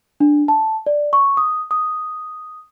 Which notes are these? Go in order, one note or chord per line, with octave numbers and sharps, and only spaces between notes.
D4
A5
D5
C#6
D#6
D#6